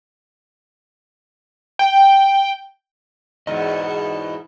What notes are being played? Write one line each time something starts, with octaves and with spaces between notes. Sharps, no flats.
G5
E2 G#2 B2 D#5